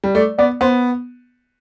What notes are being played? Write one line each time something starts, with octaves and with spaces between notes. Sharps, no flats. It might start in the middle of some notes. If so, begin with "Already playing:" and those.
G3
A3 D5
B3 D5
B3 C5